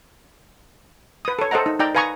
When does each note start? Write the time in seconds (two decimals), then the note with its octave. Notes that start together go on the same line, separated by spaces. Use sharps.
1.25 B4 D#6
1.39 A4 C#5
1.51 A4 C5 D#5 F#5 A#5
1.66 D#4
1.80 D#4 D5 G5 A#5
1.95 B4 F5 G#5 A#5 C#6 D#6